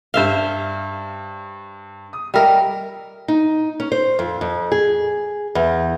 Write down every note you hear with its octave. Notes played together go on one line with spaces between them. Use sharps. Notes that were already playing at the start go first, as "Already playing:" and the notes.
G2 C5 E5 F5 G7
D#6
G3 A#4 D#5 E5
D#4
C#4
C5
F2
F2
G#4
E2